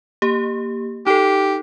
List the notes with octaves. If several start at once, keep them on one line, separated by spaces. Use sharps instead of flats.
A#3 G4
D#4 G4 A4